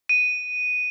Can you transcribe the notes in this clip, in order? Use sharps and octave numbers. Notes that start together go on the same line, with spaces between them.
D#7